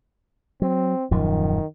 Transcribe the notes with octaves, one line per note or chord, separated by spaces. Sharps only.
F#3 C4
D#1 F#2 D#3 F3